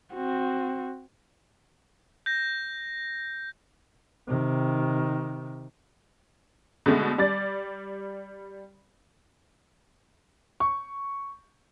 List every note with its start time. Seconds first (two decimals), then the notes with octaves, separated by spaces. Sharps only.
0.13 C4 F#4
2.26 G6 A#6
4.28 C3 D#3
6.86 B2 D3 G#3 A3
7.18 G3 D5 A6
10.60 C#6